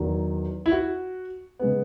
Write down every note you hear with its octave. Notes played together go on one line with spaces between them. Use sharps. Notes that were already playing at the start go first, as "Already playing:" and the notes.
Already playing: E2 D#3 F#3
E4
F#4
C#3 G#3 B3